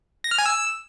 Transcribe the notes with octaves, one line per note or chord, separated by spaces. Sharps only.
A#6
F6
G#5
E6